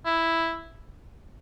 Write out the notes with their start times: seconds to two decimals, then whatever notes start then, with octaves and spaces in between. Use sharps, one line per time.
0.06 E4